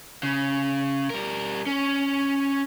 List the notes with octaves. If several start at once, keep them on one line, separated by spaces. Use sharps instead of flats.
C#3
G3 A#4
C#4